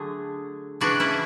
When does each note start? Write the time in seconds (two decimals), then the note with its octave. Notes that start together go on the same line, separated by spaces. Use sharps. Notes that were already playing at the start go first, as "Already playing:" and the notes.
Already playing: D3 F#3 A3 G#4
0.81 C#3 E3 G#3 D4 F#4
1.00 C#4 E4